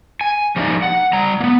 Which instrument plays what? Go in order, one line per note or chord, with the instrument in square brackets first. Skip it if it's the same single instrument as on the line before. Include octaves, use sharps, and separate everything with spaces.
[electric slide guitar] G#5
F3 G3 A#3 D4 D#4 D5
F#5
G3 A#5
A#3 B3